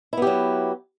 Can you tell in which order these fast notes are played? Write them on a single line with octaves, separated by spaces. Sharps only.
E4 B3 G4 F#3